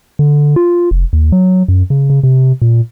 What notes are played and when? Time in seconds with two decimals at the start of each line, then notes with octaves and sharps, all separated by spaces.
0.19 D3
0.56 F4
0.91 F1
1.13 D#2
1.32 F#3
1.68 F#2
1.90 C#3
2.10 C#3
2.23 C3
2.62 A#2